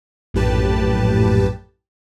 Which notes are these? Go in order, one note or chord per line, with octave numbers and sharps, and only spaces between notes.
A#1 F#2 A2 G4 B4 A5